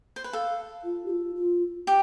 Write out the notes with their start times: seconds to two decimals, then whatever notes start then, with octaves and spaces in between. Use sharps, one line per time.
0.16 C5
0.24 B4
0.33 A4 F5
0.84 F4
1.05 G4
1.10 F4
1.35 F4
1.87 G4